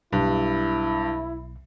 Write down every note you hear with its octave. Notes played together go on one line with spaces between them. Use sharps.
B1 G2 E4